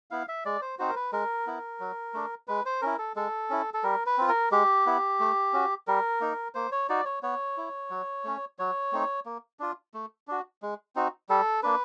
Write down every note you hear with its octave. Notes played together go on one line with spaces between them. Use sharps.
B3 E4 F5
E5
G#3 D5
C5
C4 D#4 F#4 C5
A#4
B4
G#3 A#4
B3 E4
F#3
A3 D4
G#3 B4
C5
C#4 E4 A#4
A4
G#3 A4
C#4 E4
A4
G3 A#4
B4
C4 F4
A#4
G#3 G4
B3 E4
A3
C#4 F#4
G3 A#4
A#3 D#4
A#3 C5
C#5
D#4 F#4 D5
C#5
B3 C#5
E4
F#3
A3 C#4
F#3 C#5
A3 C4 D#4
A#3
D4 F4
A3
D4 F#4
G#3
C4 D#4 F#4
G3 A4
A#3 D4 B4